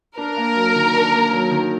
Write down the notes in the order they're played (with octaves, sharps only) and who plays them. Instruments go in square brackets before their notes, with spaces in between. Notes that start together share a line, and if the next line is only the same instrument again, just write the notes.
[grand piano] D4 [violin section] A#4
[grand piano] A#3
F#3
D#3
D4
A#3
F#3
D#3